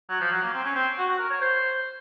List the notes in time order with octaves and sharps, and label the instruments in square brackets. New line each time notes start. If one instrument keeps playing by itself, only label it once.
[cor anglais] F#3
F3
F#3
A#3
C4
C#4
C4
F#4
F#4
A#4
C#5
C5